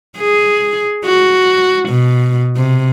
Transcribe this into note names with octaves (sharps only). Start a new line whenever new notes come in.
G#4
F#4
B2
C3